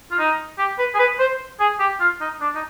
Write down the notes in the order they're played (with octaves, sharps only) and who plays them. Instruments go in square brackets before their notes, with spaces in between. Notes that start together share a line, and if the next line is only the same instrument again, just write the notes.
[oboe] F4
D#4
G4
B4
G#4
B4
C5
G#4
G4
F4
D#4
D4
D#4